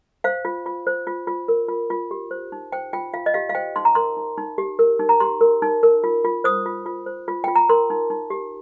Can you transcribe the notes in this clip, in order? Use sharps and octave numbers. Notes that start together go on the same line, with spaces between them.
C5 F5
F4
F4
C5
F4
F4
A#4
F4
F4
G4
C5
D#4
C5 G5
F4 G5
F4 F5
D#5
G4 F5
F5
C5 G5
D#4 C6
A#5
A#4 C6
D#4
D#4
G4
A#4
D#4
A#5
G4 C6
A#4
D#4
A#4
F4
F4
C5 D#6
F4
F4
C5
F4
F4 G5
A#5
A#4 C6
D#4
D#4
G4